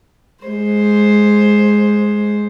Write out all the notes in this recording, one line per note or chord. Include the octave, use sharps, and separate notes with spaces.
G#3 C5